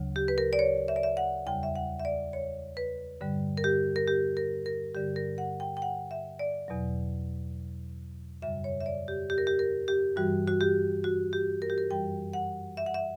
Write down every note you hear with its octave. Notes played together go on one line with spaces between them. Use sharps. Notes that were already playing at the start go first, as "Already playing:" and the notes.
Already playing: D2 C#3 F#3
G4
B4
A#4
D5
C#5
E5
D5
E5
F#5
E2 C#3 G3 G5
E5
F#5
E5
D5
C#5
B4
G2 D3 G3
A#4
G4
A#4
G4
A#4
A#4
G2 D3 G3 G4
A#4
F#5
G5
G5
F#5
E5
D5
E2 B2 F#3
F#2 C#3 G3 E5
C#5
E5
D5
G4
G4
A#4
G4
A#4
G4
G2 E3 G3 F#4
F#4
G4
F#4
G4
A#4
G4
A#4
F#2 E3 G3 G5
F#5
E5
F#5
E5